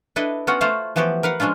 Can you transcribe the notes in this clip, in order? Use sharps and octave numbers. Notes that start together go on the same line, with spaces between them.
D4 E4 A4 B4 D#5
B3 C#4 F4 F#4 F#5
A3 F4 F#4 C5 F5 F#5
E3 F3 B3 F#4 G4
A#4 B4 F5 F#5
F3 G#3 C#4 D4 F4